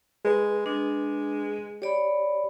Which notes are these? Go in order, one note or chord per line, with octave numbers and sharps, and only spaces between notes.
G#3 G#4 B4
G#3 D4
G4 C#5 D5 B5